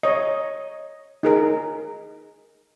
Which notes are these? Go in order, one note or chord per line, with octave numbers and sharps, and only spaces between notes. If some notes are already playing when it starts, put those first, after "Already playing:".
C#5 D#5
D#4 G#4 A#4